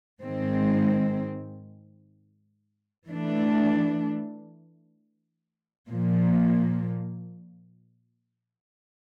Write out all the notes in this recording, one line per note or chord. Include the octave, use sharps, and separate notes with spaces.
G#2 D#3 G#3 C4
E3 A3 D4
A#2 F3 A#3